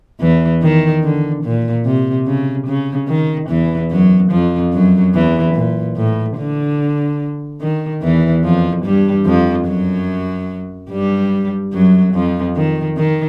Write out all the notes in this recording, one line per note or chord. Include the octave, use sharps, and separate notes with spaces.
E2 E3
D#3
D3
A#2
C3
C#3
C#3
D#3
E2 E3
F#2 F#3
F2 F3
F#2 F#3
E2 E3
A#2
A2
D3
D#3
E2 E3
F2 F3
G2 G3
F2 F3
F#2 F#3
G2 G3
F#2 F#3
F2 F3
D#3
D#3